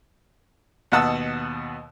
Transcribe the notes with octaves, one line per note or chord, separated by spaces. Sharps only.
D#2 B2 F#5 A5 D#6 E6